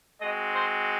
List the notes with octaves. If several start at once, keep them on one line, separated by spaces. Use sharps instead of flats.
G#3 C4 F#4 D#5
C5